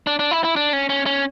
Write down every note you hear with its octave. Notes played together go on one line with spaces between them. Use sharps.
D4
D4
E4
E4
D4
C#4
C#4
C#4